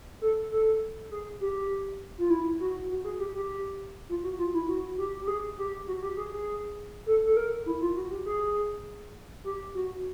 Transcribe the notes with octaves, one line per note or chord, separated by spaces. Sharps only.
A4
A4
G#4
G4
F4
E4
F#4
F#4
G#4
G4
G4
F4
F#4
F4
E4
F#4
G4
G4
G#4
G4
F#4
G4
G#4
G#4
A4
A4
A#4
E4
F4
F#4
G4
G#4
G4
F#4